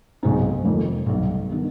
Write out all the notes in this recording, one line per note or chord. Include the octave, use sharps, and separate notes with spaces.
B1 B2 G#3 C4 D#4
F1 F2 D#3
B1 B2 G3 B3
D#3 G3 B3 D4